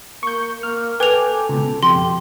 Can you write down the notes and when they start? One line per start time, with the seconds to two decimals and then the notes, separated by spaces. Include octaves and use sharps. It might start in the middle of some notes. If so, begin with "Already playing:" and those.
0.23 A#3 C#6 G6
0.63 A#3 F6
1.00 A4 B4 G5 G#5 D6 F7
1.49 C#2 B2
1.83 F2 G4 C6